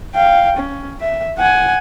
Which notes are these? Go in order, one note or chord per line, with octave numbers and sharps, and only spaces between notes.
F5 G5
C#4
E5
F#5 G#5